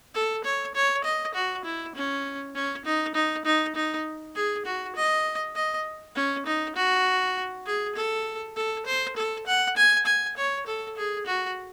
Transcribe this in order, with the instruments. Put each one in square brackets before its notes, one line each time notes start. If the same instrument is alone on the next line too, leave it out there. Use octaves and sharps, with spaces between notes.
[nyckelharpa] A4
C#5
C#5
D#5
F#4
E4
C#4
C#4
D#4
D#4
D#4
D#4
G#4
F#4
D#5
D#5
C#4
D#4
F#4
G#4
A4
A4
C5
A4
F#5
G#5
G#5
C#5
A4
G#4
F#4